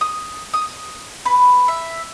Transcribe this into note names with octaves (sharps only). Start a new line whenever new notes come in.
D#6
D#6
B4
E5